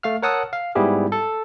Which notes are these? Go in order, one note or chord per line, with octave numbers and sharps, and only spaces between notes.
A3 F5 F6
A#4 C#5 F#5 A5 D#6 E6
F5
G#2 G3 B3 E4 G4 G#4
A4